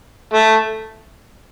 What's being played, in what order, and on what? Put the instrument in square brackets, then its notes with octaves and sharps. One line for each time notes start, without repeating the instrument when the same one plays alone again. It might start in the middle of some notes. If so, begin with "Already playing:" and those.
[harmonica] A3